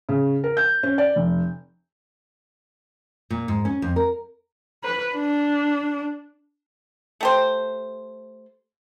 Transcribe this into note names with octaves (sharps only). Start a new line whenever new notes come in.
C#3
A#4
G6
C#4
D5
F1
A#2
G#2
C#4
F2
A#4
B4
D4
A3 G4 C5